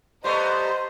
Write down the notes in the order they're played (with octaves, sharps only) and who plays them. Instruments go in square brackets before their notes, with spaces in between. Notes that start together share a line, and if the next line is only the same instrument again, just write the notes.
[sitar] G3 A3 B3 [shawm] C5 [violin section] D#5 F#5 A#5 [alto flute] C6